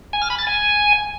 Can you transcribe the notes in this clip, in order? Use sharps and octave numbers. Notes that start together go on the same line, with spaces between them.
G#5
F6
B5
A6
G#5